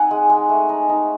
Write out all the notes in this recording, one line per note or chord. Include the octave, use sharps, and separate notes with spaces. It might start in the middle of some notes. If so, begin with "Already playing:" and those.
Already playing: C4 D#4 F#5 G#5
G#3
G#3
A3
D#4
D#4